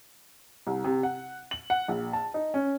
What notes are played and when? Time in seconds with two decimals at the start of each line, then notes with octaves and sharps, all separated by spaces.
0.67 C2
0.84 C3
1.03 F#5
1.51 F#7
1.70 F#5
1.88 A#1
2.13 A5
2.34 D#4
2.54 C#4